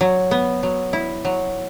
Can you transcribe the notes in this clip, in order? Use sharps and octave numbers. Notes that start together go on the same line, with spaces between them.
F#3
B3
F#3
E4
F#3